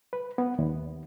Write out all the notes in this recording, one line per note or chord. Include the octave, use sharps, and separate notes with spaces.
B4
B3
D#2